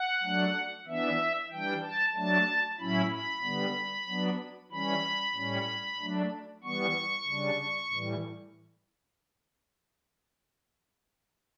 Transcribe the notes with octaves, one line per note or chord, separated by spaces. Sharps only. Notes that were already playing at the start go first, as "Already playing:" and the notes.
Already playing: F#5
F#3 A3 D4
E3 B3 D4 E5
E3 G3 D4 G5
A5
F#3 A3 D4 A5
A2 F#3 C#4 E4 B5
B5
D3 G3 B3
F#3 B3 D4
E3 G3 C#4 B5
A2 G3 C#4
F#3 A3 D4
E3 G3 B3 C#6
C#3 G3 D4
A2 E3 G3